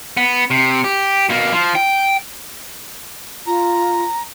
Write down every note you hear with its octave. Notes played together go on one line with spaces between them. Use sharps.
B3
C3
G4
B2 A#3
F3
G5
F4 A#5